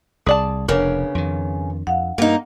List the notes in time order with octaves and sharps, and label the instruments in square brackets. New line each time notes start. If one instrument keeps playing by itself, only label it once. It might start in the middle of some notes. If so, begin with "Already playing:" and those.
[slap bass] C2 [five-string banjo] G#4 D5 A5
[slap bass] F1 [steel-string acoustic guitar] C#3 C#4 [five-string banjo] B3 A#4 [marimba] D4 C#5
[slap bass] F2 D#3
[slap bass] F2 [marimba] F5 F#5
[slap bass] G2 [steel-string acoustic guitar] A#3 D#4